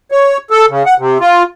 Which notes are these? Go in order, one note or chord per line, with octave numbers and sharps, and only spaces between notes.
C#5
A4
C#3
F#5
C3
F4